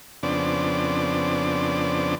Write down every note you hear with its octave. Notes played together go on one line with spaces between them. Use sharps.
F2 C#3 B3 C4 D4 D5